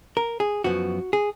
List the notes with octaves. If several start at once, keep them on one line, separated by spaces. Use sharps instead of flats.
A#4
G#4
F#2 F3 B3 F#4
G#4